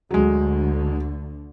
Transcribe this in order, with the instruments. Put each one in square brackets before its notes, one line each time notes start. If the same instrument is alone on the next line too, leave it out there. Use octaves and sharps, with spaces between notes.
[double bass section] D2 D3 [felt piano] F#3 G#3